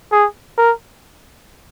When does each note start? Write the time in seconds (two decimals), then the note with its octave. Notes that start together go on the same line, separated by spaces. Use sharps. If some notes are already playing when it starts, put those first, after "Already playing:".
0.12 G#4
0.58 A#4